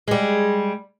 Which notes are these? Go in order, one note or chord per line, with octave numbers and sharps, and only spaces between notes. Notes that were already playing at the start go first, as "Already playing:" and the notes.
G3 G#3